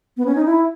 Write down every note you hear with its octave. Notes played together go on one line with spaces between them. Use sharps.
B3
C#4
D#4
E4